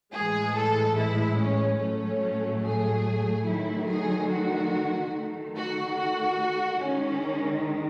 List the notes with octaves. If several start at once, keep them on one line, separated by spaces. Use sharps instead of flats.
A2 E3 G#3 G#4
A4
E4
C#4
A2 F#3 A3 C#4
G#4
D#3 F#3 A3 E4
G#4
F#4
D#3 A3
F#4
F#4
D#3 G#3 C#4